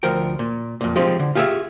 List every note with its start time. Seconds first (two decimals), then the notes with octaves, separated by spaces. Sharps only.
0.03 D2 F3 A#4 G5
0.39 A#2
0.81 F2 A#2
0.96 F3 G#3 C4 F4 G4
1.19 D3
1.35 F4 G4 G#4 C5 E5 F5